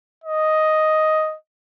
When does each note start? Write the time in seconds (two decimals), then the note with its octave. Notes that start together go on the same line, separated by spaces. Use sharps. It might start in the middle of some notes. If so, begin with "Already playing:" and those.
0.24 D#5